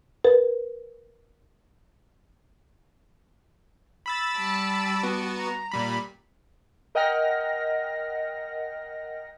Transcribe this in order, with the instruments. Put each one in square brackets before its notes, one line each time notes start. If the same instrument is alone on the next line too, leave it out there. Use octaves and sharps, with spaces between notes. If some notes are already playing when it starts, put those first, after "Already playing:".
[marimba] A#4 B4
[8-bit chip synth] B5 E6 A6
[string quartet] G3 A5 D6
[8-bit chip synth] B3 F#4
[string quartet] A#5
[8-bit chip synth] A#2 G3 B5
[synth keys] A#4 D#5 F#5 G5 F6 A#6